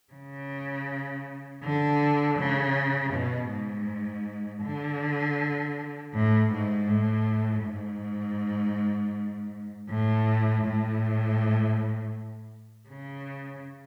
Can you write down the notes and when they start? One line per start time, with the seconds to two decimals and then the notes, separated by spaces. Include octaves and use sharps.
0.13 C#3
1.63 D3
2.38 C#3
3.13 B2
3.50 G#2
4.63 D3
6.13 A2
6.52 G#2
6.88 A2
7.64 G#2
9.90 A2
10.64 A2
12.89 C#3